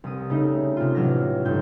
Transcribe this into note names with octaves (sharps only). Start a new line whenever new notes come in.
C2 D#6
C#3 A3 D#4
C3 F4
A1 F#3 D6 F6 A#6
G1 D#4 G6